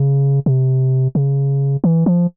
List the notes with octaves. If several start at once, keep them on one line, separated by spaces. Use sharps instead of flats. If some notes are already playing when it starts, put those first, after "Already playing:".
Already playing: C#3
C3
C#3
E3
F3